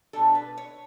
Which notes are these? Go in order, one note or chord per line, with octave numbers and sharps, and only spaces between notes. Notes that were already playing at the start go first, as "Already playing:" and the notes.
B2 G3 D4 A4
B4
C#5